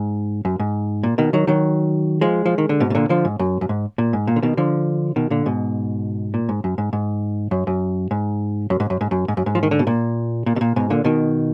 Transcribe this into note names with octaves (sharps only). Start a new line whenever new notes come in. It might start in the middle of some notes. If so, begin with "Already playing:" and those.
Already playing: G#2
F#2
G#2
A#2
B2 D#3
D#3 F#3
D#3 F#3
F3 G#3
F3
D#3
D3
G#2 B2
B2
A#2 D3
D3 F3
G#2
F#2
F#2
G#2
A#2
G#2
A#2
D3
B2 D#3
D3 F3
B2 D#3
A#2 D3
G#2 B2
A#2
G#2
F#2
G#2
G#2
F#2
F#2
G#2
F#2
G#2
F#2
G#2
F#2
G#2
F#2
G#2
F3
D#3
D3
B2
A#2
A#2
B2
A#2
G#2 B2
A#2 D3
B2 D#3